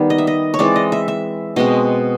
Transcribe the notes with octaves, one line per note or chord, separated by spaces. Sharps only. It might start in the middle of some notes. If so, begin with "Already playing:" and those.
Already playing: D#3 G3 B3
D#5
E5
D#5
C#5
E3 G#3 C4 D5
D#5
E5
E5
B2 G#3 C4 D#5